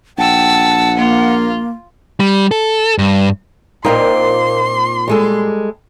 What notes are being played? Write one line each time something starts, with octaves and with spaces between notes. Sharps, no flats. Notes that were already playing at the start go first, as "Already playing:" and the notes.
A#1 F#5 G5 A5 E6
A#3 F4
G3
A4
G2
A#2 C4 D#4 A#4 D5 F5 C6
G3 G#3 A4